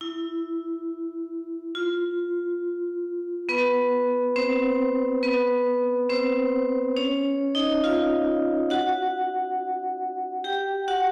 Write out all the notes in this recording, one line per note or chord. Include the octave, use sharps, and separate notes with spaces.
E4
F4
B3 B4
C4 C5
B3 B4
C4 C5
C#4 C#5
D#4 D#5
F4 F5
F#4 F#5
G4 G5
F#4 F#5